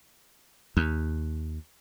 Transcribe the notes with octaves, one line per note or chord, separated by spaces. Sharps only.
D#2